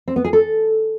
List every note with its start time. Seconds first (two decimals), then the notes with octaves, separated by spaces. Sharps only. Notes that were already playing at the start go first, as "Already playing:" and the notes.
0.08 C4
0.16 B3
0.25 G#4
0.33 A4